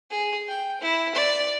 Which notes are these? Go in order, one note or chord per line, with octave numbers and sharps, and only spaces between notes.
G#4
G5
E4
D5